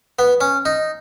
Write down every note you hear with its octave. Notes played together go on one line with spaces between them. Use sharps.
B3
C#4
D#4